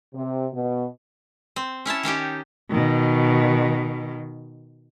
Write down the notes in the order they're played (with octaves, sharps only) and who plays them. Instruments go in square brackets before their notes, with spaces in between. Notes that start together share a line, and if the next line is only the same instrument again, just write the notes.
[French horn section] C3
B2
[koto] C4
C#4 E4 C#5 A5
D#3 C#4 D#4 G4
[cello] B2 D#3